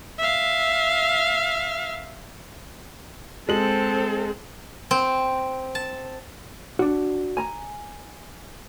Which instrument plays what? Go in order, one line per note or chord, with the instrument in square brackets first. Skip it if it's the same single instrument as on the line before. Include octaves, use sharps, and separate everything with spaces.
[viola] E5 F5
[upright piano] G#3 F#7 [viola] C4 A4
[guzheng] C4
A5
[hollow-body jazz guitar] D4 F#4
G#5 A#5